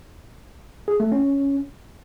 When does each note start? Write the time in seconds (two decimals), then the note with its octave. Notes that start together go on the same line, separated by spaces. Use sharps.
0.88 G#4
1.00 A3
1.12 C#4